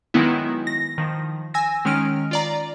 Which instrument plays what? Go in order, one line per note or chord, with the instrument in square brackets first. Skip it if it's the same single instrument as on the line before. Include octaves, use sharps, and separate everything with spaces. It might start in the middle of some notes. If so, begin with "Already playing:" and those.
[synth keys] D#3 F#3 G#3 B3 E4
A#6
D#3 F3
G#5 E6 A#6
D#3 G#3 C#4 F6 D7
F4 D5 A#5